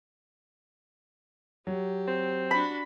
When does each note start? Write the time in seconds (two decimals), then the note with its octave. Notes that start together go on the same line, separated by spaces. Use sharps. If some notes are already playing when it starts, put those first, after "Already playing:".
1.67 F#3 G4
2.07 C4
2.51 D4 F#4 B5